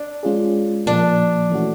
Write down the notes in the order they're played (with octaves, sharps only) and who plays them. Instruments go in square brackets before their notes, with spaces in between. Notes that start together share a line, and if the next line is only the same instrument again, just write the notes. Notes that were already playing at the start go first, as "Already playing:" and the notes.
Already playing: [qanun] D4
[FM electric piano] G#3 C#4 F4 G#4
[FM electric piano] A#2 F3 A#3 [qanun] D4
[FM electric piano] E3 A3 C#4 F#4